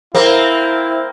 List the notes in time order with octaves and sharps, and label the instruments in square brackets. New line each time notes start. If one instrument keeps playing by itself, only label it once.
[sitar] A#3 C4 [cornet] E4